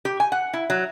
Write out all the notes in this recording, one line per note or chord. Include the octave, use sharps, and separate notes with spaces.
G4
G#5
F#5
E4
F#3